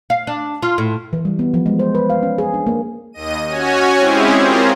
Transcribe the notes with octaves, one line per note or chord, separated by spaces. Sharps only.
F5
D4
F4
A2
E3
G3
B3
F3
G#3
C5
B4
F5
C#4
G#4
D4
A#3
D#2 D#5 D#7
C#4 F#4 C#5 G#5
G#3 C4 C#4 E4 G4 G#4
C4 C#4 F4 G#4 A#4 C5